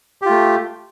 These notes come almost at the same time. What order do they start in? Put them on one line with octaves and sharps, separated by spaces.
G4 F4 A3